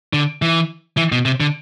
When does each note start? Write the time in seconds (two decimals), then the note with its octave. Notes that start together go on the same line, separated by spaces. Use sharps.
0.13 D3
0.42 E3
0.97 E3
1.12 B2
1.25 C3
1.40 D3